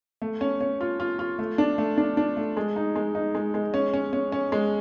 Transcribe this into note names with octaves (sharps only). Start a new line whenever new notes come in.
A3
C#4
C#4
F4
F4
F4
A3
D4
A3
D4
D4
A3
G#3
D#4
G#3
D#4
G#3
G#3
C#4
C#4
C#4
C#4
G#3